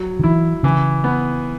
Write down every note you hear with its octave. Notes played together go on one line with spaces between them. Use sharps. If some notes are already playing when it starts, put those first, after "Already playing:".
Already playing: F#3
D#3
E3 E4
C#3 E3
B3